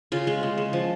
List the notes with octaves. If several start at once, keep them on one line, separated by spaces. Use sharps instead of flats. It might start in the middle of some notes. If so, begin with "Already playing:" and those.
C#3 F4
G#3
C#3
C#3
F3